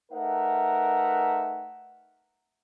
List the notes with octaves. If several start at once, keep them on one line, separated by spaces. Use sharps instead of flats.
A3 D#4 A#4 B4 E5 F#5